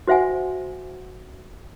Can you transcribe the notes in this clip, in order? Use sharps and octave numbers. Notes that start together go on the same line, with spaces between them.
F#4 C5 E5 F#5 G#5